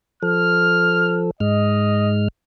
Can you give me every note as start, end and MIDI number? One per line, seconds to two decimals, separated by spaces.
0.23 1.31 53
0.23 1.31 69
0.23 1.17 89
1.40 2.28 44
1.40 2.28 56
1.40 2.13 75
1.40 2.28 89